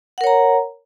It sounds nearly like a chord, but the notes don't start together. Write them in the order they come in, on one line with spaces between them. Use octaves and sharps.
F#5 A#4 C#5 A#5